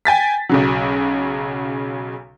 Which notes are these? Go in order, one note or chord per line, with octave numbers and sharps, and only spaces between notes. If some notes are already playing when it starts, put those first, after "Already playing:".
G5 G#5 A6 B6
B1 C#3 F#3